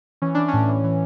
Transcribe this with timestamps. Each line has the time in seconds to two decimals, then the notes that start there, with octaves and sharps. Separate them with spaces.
0.22 E3 C#4
0.35 E3 D4
0.48 C#4
0.53 A2
0.68 E3
0.84 E3